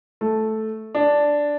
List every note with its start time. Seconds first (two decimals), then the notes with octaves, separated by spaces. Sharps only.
0.21 A3
0.95 D4